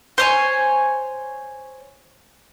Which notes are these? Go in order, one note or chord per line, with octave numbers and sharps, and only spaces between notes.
C5 C#5 G#5